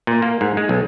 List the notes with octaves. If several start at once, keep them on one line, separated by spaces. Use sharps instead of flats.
A#2
A#3
G#2
G#3
B1